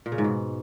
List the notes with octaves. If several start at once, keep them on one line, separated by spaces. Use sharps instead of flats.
A#2
C#3
G#2
B2